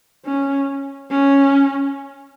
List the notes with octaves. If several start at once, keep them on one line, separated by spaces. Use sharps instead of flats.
C#4
C#4